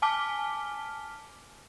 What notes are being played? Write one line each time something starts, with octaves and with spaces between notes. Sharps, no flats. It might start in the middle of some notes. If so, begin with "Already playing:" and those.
G#5 A5 D6 F6 B6 G7